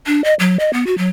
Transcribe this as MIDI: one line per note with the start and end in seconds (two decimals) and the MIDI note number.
0.07 0.23 62
0.24 0.34 75
0.39 0.57 54
0.59 0.71 75
0.73 0.86 59
0.86 0.97 66
0.98 1.09 54